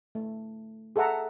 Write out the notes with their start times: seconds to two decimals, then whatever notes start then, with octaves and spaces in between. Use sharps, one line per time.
0.15 A3
0.96 G#4 A4 E5 F#5 A#5